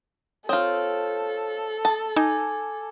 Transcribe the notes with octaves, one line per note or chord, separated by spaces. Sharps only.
C4 F4 A4 C#5 F5 D#6
A5 D#6
D#4 G#5 D6 G#6